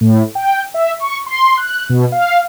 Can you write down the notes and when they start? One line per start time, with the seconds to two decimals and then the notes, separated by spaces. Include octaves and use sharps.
0.01 A2
0.35 G5
0.74 E5
1.00 C#6
1.26 C6
1.57 F#6
1.90 B2
2.12 F5